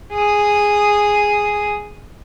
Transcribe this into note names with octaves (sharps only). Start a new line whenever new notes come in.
G#4 D#6